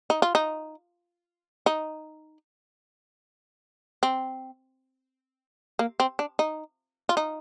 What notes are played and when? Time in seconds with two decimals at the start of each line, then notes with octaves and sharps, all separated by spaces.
0.10 D#4
0.22 F4
0.35 D#4
1.66 D#4
4.03 C4
5.79 A#3
6.00 C4
6.19 D4
6.39 D#4
7.09 F4
7.17 D#4